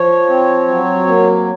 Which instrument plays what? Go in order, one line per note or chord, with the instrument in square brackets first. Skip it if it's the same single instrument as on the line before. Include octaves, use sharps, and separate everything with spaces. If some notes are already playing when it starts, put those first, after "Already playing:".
Already playing: [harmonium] F3 C#5
C4
F#3
A#3